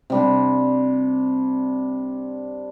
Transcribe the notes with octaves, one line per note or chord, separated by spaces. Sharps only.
C3 G3 D4